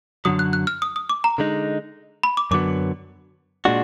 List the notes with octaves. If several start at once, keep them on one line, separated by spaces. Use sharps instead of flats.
F#2 D3 F#3 D#6
F#6
F#6
F6
D#6
D#6
D6
A#5
D3 G#3 D#4
B5
D6
F#2 D3 F#3 B3 D6
A#2 G#3 D4 F#4